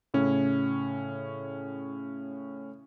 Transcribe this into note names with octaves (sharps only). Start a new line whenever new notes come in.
A2 C#3 C#4